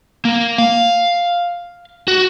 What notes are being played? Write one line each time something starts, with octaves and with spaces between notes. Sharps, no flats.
A#3
F5
F#4